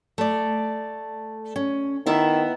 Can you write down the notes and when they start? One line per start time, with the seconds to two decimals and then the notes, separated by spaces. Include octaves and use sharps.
0.18 A3 D5
1.56 C#4
2.06 D#3 B3 E4 E5